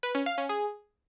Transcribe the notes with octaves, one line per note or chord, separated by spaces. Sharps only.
B4
C#4
F5
C#4
G#4